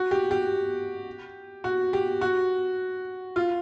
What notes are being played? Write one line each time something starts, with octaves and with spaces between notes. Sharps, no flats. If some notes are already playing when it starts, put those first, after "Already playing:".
Already playing: F#4
G4
G4
F#4
G4
F#4
F4